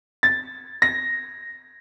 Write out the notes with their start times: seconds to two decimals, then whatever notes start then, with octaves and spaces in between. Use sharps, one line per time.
0.23 A6
0.82 A#6